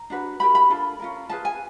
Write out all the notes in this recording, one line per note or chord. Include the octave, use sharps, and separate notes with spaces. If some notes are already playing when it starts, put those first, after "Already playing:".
Already playing: A#5
D4 F#4 B4
E4 G4 A#4 B5
B5
D4 F4 A4
C#4 F4 A#4
F4 G#4 B4 A5
G#5